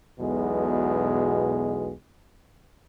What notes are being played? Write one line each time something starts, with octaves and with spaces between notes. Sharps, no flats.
B1 E2 B2 G#3